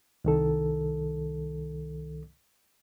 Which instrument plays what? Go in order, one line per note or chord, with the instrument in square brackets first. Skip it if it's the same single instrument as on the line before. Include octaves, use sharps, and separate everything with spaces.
[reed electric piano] C2 D#3 A4